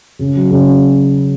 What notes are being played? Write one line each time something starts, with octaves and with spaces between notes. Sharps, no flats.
C#3
F#3
C#3